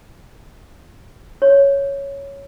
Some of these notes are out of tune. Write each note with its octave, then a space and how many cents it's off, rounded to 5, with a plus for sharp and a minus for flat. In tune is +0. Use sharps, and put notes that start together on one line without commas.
C#5 +5